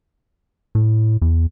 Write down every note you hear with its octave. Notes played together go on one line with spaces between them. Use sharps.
A2
E2